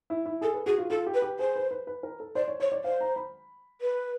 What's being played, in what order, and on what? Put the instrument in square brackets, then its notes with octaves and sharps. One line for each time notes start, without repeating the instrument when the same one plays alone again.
[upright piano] E4
E4
[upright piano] G#4 [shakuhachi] A4
[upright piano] B4
[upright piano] F#4 [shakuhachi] G#4
[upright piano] F4
[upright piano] F4 [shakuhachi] A4
[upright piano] G4
[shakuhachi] B4
[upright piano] G4
[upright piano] G#4 [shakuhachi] C5
[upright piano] B4
B4
B4
A#4
A4
[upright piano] C5 [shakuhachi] D5
[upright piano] C#5
[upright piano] C5 [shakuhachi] C#5
[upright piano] D5
[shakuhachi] C5 [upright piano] F5
[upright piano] A#5
B5
[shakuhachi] B4